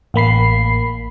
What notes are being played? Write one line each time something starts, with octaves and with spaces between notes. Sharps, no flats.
A1 A#3 B5 C7